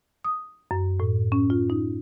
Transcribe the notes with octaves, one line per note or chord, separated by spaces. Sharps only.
D#6
F#2
A2
C#4
F4
D#4